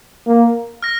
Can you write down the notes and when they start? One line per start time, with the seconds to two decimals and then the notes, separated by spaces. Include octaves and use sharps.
0.27 A#3
0.83 F6 A#6